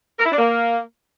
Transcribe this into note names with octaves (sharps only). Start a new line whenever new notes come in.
A#4
E4
D4
A#3